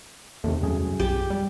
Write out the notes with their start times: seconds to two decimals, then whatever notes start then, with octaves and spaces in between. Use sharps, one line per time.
0.44 E2 C3 D#3 A3
0.63 C2 F#2 G#4
1.00 B1 G4
1.30 G3 D5